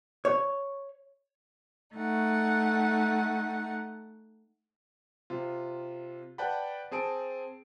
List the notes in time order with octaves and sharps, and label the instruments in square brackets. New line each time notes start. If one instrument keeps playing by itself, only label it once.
[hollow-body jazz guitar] C#5
[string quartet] A3 D#4 F#5
[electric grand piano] C3 F4
B4 D5 F#5 G5 A5 B5
C4 G#4 A5 D7